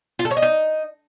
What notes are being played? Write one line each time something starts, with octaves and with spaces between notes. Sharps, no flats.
F4
A4
C#5
D#5
D#4